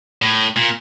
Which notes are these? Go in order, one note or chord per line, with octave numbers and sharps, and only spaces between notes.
A2
A#2